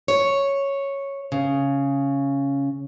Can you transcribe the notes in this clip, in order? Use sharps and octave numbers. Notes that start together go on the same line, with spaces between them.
C#5
C#3